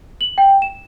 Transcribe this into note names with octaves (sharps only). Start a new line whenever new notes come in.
F#7
G5
E7